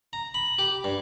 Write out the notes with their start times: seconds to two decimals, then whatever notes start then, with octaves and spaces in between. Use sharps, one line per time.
0.13 A#5
0.34 B5
0.59 G4
0.84 G2